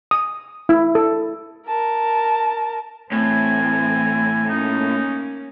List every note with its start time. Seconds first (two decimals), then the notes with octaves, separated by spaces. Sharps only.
0.11 D#6
0.69 E4
0.95 A4
1.67 A#4 A5
3.12 A2 E3 C4 G#5
4.50 A#3 C#4 D#4